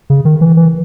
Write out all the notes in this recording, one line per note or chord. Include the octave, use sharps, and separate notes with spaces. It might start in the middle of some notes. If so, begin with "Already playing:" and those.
C#3
D#3
E3
E3